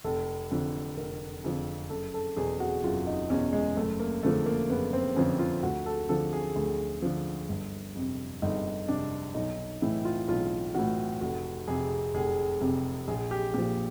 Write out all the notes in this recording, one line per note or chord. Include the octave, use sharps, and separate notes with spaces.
F1 A4
F2 D3 F3
F1 A#4
F2 D3 F3
F#1 A4
A4
E2 B2 G#4
F#4
F#1 F4
D#4
E2 B2 C#4
G#3
F#1 A3
A#3
F2 D3 F3 A3
A#3
F#1 B3
C4
F2 D3 F3 C#4
F4
D2 F#4
A4
D3 F3 A4
G#4
D2
D3 F3
G1
F2 C3
G1 D#4
F2 C3 D4
B1 D#4
A2 E3 E4
F4
B1 F4
A2 E3 F#4
F1 F#4
F2 C3 G#4
F1 G#4
F2 C3
A#1 G#4
G4
A#2 F3 G4